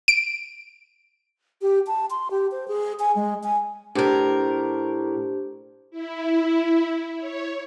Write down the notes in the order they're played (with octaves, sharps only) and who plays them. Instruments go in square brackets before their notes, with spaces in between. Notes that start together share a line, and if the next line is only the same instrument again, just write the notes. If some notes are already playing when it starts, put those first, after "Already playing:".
[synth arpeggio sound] D7
[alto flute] G4
A5
C6
G4
C5
G#4
G#5
G#3
G#5
[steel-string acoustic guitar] A2 A#4 [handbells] D4 G4 C5
[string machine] E4
C#5